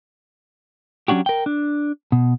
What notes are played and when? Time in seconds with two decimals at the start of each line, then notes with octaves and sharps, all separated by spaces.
1.08 F#3 C#4 D4 F#4 G4
1.26 A#4 G5
1.46 D4
2.12 B2